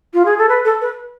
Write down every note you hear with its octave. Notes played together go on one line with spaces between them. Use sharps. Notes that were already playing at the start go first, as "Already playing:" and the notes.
F4
G#4
A4
B4
A4
B4